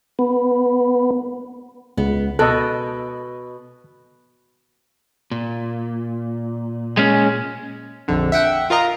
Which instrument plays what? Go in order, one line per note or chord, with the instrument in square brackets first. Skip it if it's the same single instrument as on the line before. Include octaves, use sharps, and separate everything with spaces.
[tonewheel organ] B3
[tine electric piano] C#2 C#3 [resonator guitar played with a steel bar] B3
[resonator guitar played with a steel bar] B2 [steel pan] A4 D#5 [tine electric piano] F#6
[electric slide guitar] A#2
[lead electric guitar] G#3 C#4
[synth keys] A#1 F2 D3
E5 F#5 G5
F4 A#4 D#5 A#5